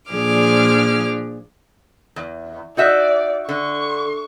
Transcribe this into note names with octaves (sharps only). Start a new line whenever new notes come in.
A#2 F3 D4 G#4 D6 F6
E2
D#4 F#4 D5 E5
D3 C#6